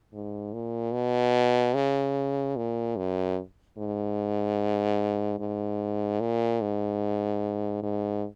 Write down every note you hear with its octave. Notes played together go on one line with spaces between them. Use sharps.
G#2
A#2
B2
C#3
A#2
F#2
G#2
G#2
A#2
G#2
G#2